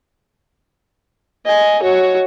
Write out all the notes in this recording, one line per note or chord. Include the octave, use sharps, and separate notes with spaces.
D#5 G#5
F#4 C#5